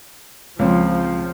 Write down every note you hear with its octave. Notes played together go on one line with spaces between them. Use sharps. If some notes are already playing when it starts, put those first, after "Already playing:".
C#2 F3 C4